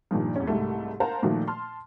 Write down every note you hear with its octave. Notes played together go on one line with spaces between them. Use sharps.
G2 A#2 D#3 F3
E2 C#4
C2 G#2 G3 A3
A#4 C5 F5 F#5 A5 A#5
A#2 D#3 F3 A3 F#4
A5 C6 F6